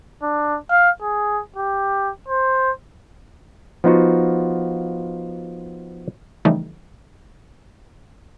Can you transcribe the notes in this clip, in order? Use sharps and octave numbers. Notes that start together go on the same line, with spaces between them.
D4
F5
G#4
G4
C5
F3 B3 D#4 F4 F#4
C#3 E3 F3 G3 A3 D#4